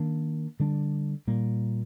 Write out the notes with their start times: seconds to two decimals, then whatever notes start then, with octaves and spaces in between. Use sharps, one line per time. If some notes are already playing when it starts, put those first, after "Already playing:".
Already playing: D#3 A#3 D4
0.60 D3 G3 D4
1.27 A#2 G3 A#3